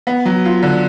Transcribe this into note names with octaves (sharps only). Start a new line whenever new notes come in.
B3
F#3
F4
D3